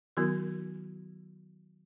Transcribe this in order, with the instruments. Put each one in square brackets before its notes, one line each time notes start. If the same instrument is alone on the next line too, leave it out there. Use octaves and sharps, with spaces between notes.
[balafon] D#3 F#3 B3 E4 F#4 A#4